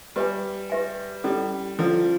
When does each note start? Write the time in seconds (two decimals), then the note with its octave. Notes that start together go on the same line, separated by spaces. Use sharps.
0.16 G3 G4 B4 E5 G#5
0.70 G4 B4 E5 G#5
1.24 G3 C#4 E4 A4 D5
1.78 F3 C#4 E4 A4 D5